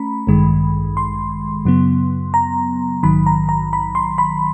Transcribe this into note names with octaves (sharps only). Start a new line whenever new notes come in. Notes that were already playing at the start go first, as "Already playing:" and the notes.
Already playing: A3 C#4 A#5 B5
A1 G2 D#3 G#3
C6
F#2 C#3 F#3 B3
A#5
A#1 G#2 D#3 F#3 B5
A#5
A#5
B5
C6
B5